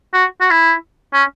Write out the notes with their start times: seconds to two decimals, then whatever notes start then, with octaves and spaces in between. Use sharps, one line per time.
0.14 F#4
0.41 F#4
0.51 E4
1.13 C#4